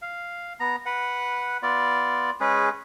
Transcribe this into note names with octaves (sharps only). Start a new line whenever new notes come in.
F5
B3 A#5
B4 F#5
B3 F4 D5
G#3 C#4 G#4 B4